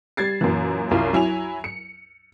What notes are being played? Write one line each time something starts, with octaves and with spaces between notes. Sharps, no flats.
G3 G#6 A6 C7
F#2 A#2 E3
C2 F#2 E4 F4 F5
F#3 E4 G#5 F7
C#7